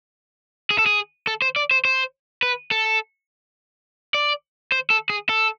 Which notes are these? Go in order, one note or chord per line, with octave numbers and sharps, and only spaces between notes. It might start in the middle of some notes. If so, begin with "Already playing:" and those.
G#4
A4
G#4
A4
C5
D5
C5
C5
B4
A4
D5
C5
A4
G#4
A4